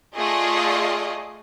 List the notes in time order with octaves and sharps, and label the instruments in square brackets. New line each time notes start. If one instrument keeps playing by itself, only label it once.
[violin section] A3 F4 G#4 D5 D#5